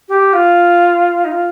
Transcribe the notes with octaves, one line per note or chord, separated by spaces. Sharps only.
G4
F4
D#4
F4